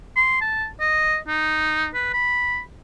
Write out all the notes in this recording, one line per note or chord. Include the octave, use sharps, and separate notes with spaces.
C6
A5
D#5
D#4
B4
B5